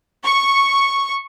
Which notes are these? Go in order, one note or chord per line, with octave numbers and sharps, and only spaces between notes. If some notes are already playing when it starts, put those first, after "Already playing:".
C#6